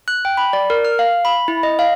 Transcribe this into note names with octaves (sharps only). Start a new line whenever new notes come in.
F#6
G5
B5
D5
A#4
F6
F5
B5
E4
D#5
F5